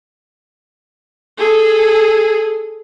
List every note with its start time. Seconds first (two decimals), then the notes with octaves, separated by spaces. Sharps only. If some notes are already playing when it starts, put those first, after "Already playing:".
1.38 G#4 A4